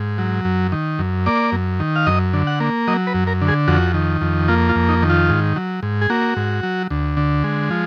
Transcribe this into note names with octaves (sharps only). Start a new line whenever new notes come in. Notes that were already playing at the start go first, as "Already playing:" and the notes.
Already playing: G#2
F#3
F#2
D#3
F#2
A#3 D5
F#2
D#3
F5
F#2 D#5
D3
F#5
A#3
F#3 D#5
B4
F#2
A#4
D3
G#4
F2 F#4
D#3
F2
A#3 F4
F4
F2
D#4
D#3
F4
G#2
F#3
G#2
G#4
A#3 F#4
G#2
F#3
D2
D3
G#3
F3